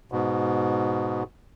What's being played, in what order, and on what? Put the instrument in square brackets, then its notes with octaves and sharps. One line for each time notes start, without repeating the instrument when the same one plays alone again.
[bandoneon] G#2 B2